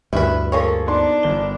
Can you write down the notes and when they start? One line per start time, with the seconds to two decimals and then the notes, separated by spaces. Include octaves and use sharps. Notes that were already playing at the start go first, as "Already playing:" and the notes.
0.13 D2 G2 E4 B4
0.52 F3 A#3 G#4 A4 C#5
0.87 B3 D4 D#4 C6
1.23 G1 G7